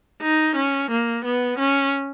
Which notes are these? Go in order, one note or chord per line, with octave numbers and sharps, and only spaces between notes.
D#4
C#4
A#3
B3
C#4